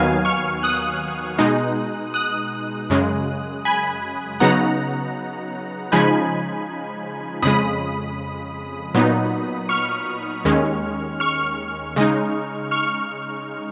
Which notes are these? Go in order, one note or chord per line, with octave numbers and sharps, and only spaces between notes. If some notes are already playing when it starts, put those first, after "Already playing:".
Already playing: D#2 D#3 F#3 B3 F5 G#5
C#6 F6
D#6 F#6
B2 G#3 D#4
D#6 F#6
F#2 C#3 G#3
G#5 B5
C#3 F#3 B3 D#4 F#5 A#5
C#3 F3 G#3 D#4 G#5 B5
F2 C#3 G#3 B5 D#6
A#2 F#3 B3 D#4
C#6 F6
D#2 D#3 G#3 C#4
C#6 F6
C#3 G#3 D#4
C#6 F6